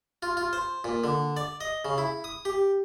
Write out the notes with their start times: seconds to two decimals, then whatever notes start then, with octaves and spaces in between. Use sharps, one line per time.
0.23 F4
0.37 F4
0.53 C5
0.84 A#2
1.04 D3
1.37 D5
1.61 D#5
1.85 C#3
1.98 E4
2.24 D#6
2.45 G4